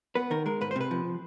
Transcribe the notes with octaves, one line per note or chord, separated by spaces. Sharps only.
B3 B4
D#3 A#4
G#3 A#4
G#2 B4
C5
C3 B4
F3